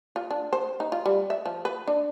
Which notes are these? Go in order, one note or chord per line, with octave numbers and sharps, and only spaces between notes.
F4
D4
C5
D#4
F4
G3
E5
F3
B4
D4